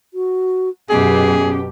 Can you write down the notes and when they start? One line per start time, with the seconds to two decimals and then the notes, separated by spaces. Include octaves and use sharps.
0.14 F#4
0.89 F#2 B2 C#4 G4 G#4